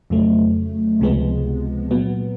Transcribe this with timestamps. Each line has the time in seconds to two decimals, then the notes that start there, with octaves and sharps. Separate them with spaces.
0.10 F2 C#3 F#3 A3
1.00 C#2 C3 F3 G#3 B3
1.91 A#2 F#3 B3